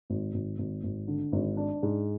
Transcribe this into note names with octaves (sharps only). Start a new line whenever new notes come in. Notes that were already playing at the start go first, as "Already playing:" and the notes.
G#1
G#1
G#1
G#1
D3
G#1
D4
G#2